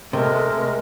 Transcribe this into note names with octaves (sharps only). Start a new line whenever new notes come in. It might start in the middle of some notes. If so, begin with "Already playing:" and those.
C3 G#3 A3 A#4